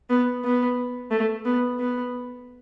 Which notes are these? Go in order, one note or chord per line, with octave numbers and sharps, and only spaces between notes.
B3
B3
A3
B3
B3